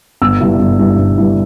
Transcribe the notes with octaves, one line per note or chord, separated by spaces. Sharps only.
G1 E6
G2 G3 E4
G1
G2 G3 E4
G1
G2 G3 E4